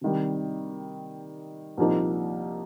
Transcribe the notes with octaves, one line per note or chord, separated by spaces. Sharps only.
C3 D#3 G3
C2 A#2 F3 A#3 D#4